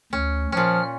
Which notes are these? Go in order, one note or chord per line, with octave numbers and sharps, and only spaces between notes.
D2 C#4
A#2 F3 C#4 F6